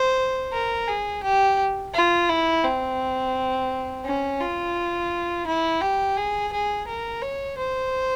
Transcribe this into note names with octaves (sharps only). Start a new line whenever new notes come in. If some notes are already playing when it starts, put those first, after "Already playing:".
Already playing: C5
A#4
G#4
G4
F4
E4
C4
C#4
F4
E4
G4
G#4
G#4
A#4
C#5
C5